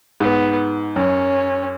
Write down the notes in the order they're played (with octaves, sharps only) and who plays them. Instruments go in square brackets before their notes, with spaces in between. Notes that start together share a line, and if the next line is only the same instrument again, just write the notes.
[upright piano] G#2 [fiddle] B3
[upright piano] F#2 [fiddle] C#4